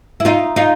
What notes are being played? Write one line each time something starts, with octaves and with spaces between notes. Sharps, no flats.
E4
D#4 F4
D#4 F4